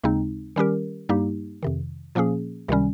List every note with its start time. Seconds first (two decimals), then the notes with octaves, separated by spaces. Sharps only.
0.04 D#2 C#3 G#3 C4 D#4
0.56 D#3 G3 C#4 G4 A#4
1.09 G2 G3 A#3 D#4 G4
1.63 F2 C3 D#3
2.15 A#2 F3 A#3 C#4 G#4
2.68 C#2 C3 D#3 G3 C#4